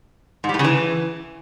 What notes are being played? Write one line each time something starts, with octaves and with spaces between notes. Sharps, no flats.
G#2
G3
A2
C#3
E3